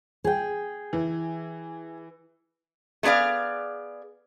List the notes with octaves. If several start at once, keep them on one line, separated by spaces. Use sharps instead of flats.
G#4 G5
E3
A3 B3 G#4 D5 F5